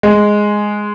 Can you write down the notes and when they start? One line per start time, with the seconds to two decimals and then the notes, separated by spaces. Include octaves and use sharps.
0.03 G#3